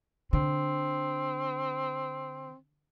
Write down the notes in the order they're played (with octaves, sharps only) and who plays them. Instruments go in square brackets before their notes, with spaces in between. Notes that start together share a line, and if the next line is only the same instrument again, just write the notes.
[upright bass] D3 [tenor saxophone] C4